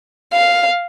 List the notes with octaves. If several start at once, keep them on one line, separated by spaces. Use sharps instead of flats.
F5